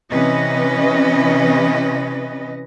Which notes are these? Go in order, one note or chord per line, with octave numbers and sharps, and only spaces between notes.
C3 E3 C#4 B4 D#5